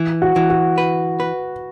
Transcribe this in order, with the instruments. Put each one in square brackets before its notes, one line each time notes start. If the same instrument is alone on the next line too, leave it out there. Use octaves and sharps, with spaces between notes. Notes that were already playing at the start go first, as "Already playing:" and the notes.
Already playing: [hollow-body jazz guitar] E3
[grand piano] F#4
[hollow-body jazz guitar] E3
[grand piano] F#4
[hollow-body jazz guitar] B4
B4